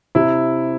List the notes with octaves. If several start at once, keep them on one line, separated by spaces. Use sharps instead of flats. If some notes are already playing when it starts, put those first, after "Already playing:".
C3 E4